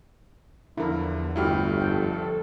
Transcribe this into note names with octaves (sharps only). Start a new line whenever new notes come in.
E2 D3 F3 E4 A#4
G1 C2 A3 E4 F#4 G4 F6
F2 A4 G5